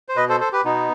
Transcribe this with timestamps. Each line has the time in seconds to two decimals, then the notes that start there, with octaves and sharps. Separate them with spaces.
0.09 C5
0.16 B2 B4 D#5
0.29 A4 C5
0.40 A4 C5
0.52 G4 B4
0.64 B2 B3 D#4